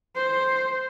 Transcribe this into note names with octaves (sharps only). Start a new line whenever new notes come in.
C5